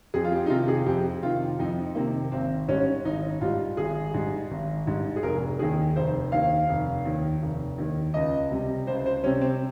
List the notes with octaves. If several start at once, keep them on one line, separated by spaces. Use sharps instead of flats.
F2 G#4
F4
G4
D#4
C3 D#3 F4
G#4
F2 G4
C3 D#3 F4
F2 D#4
C3 D#3 A#3
G#1 C4
G#2 G3 C#4
G#1 D#4
G#2 G3 F4
G#1 G#4
G#2 G3
G#1
G#2 G3
G#4
F1 A#4
D#2 D#3 G#4
F1 C5
D#2 D#3 F5
F1
D#2 D#3
F1
D#2 D#3
C#2 D#5
C3 G3
C#2 C5
C5
C3 G3 C#4
C4